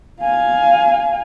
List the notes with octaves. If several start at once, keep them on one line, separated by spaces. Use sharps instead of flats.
F5 G#5